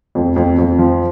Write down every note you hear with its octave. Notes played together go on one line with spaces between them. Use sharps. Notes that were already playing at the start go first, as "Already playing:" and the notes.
F2
F2
F2
F3